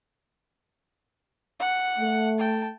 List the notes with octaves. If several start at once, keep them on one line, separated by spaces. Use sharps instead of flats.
F#5
A3
G5 A5